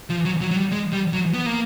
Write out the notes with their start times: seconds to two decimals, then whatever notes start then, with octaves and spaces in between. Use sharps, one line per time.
0.10 F3
0.25 F#3
0.41 F#3
0.51 F#3
0.56 G3
0.72 G#3
0.92 G3
1.13 F#3
1.34 B3
1.46 A#3